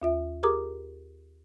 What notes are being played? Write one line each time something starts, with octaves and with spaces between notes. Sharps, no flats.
D#2 F4 E5
G4 G#4 A#4 A#5 D6 D#6